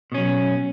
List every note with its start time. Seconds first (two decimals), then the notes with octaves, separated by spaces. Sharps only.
0.12 B2
0.14 C#4
0.17 F#3